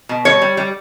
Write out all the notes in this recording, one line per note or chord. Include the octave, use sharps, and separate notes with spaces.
B2
G3 C#5
G3
G3